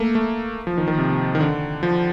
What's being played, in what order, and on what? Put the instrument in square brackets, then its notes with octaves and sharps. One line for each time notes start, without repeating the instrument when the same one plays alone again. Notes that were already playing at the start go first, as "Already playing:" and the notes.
Already playing: [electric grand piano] A3 A#3
A3
F3
D#3
D#3
C3
D#3
D3
F3